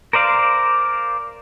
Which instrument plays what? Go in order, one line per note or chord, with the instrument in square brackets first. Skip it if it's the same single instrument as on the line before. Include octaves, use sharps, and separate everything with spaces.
[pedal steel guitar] A#4 C5 D5 F5